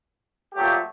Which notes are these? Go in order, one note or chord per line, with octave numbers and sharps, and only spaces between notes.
A#2 F#3 A3 G4